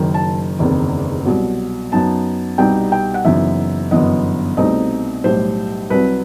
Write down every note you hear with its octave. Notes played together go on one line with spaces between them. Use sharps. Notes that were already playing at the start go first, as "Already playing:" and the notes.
Already playing: F#1 F#2 D#3
A5
F#1 E2 C3 D#3
C2 B2 F#3
F#2 F#3 B3 D#4 A5
C2 B2 G3 B3 D#4 G5
G5
F#5
F#1 F#2 E3 B3 D#4 E5
G1 F#2 E3 B3 D#5
C2 B2 A3 C4 D#4 D#5
B1 A2 G3 C5
C2 C3 F#3 B4